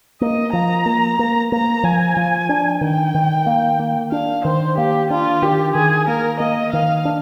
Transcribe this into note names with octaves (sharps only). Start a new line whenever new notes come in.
A#3 D#5
F3 A#5
A#3
A#3
A#3 A#5
F3 G#5
F3
D4
D#3 G5
D#3
A#3
A#3
D4 F5
D#3 C5
A#3 G4
D4 F4
D#3 G4
D#3 G#4
A#3 A#4
A#3 D#5
D#3 F5
D4